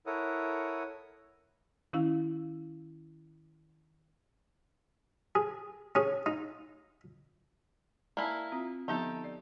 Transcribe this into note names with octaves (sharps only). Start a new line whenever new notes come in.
E4 A4 A#4 C#5 F#5 D#6
D#3 C#4 E4 F5 E6
G#4
C#4 G#4
D#4
A#3 E4 D5 G#5 A5
C4 F4
D3 F3 B3 D#4 G4 A4
D5